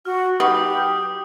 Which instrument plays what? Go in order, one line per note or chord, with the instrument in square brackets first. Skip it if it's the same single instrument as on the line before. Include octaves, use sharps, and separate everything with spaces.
[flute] F#4 [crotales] F6
[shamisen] F#3 D#4 B4 [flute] G4 [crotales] D#6 F6